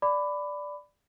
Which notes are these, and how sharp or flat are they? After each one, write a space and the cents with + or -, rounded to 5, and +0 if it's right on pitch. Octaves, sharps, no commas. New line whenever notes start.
D5 +0 B5 +15 D6 +0